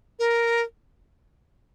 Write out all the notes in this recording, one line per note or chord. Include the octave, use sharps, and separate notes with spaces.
A#4